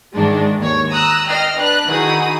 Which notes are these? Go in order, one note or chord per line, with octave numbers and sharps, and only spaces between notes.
G#2 D#3 E3 G#3 D4
D#2 C#5
A#5 D#6 E6 F#6
D#5 G5 F6 C7
D4 B4 F#6
D#3 D#4 E4 F#4 G#4 D#6